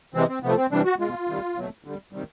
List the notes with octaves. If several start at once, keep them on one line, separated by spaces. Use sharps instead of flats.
C3 E3 G#3 C4
C4
C3 F3 A3 B3
C4
C3 E3 G3 D4
F#4
B2 G#3 F4
C3 D#3 G3
B2 F#3 A3
D3 G3
C3 D#3 G3